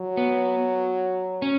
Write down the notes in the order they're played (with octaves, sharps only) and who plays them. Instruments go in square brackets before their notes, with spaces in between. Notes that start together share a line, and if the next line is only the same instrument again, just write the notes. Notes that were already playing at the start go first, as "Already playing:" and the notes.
Already playing: [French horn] F#3
[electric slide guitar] B3
C#4